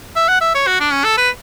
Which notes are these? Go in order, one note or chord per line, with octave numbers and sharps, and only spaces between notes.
E5
F#5
E5
C#5
F#4
D4
C#4
A4
B4